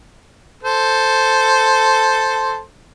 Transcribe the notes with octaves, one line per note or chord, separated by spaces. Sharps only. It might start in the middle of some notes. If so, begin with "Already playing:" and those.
A4 C5